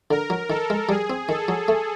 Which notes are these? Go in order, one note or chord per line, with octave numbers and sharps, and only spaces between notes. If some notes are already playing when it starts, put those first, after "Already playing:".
D3 A#4
F#3
D#3 A4
G#3
G3 G#4
C4
D#3 A4
F#3
A3